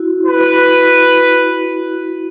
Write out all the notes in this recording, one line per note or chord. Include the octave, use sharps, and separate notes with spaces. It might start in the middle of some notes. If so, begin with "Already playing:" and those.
Already playing: E4 F#4
B4